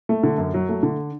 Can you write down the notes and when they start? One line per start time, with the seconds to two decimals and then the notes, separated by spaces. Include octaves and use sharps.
0.09 A3
0.23 D3
0.38 F#2
0.54 F#3
0.69 A3
0.83 D3